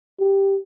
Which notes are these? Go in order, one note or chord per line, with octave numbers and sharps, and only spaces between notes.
G4